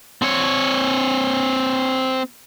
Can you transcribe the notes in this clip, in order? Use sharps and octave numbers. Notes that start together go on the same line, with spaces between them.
C4 C#5